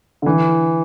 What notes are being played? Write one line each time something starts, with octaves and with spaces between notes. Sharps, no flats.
D3
E3